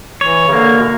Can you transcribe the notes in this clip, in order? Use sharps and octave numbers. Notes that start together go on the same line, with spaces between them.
E3 C#5
C#3
D3 A#3
B2